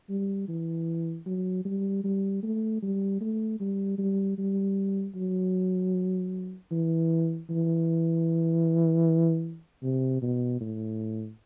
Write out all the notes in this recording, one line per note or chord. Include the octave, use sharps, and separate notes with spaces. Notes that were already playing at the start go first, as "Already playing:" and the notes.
G3
E3
F#3
G3
G3
A3
G3
A3
G3
G3
G3
F#3
E3
E3
C3
B2
A2